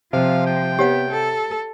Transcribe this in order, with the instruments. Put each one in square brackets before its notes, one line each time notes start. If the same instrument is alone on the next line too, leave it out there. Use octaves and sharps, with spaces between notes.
[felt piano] C3 [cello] F3 [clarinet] F5
[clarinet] G5
[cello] B3 [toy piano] G4 C#5 F#5
[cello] A4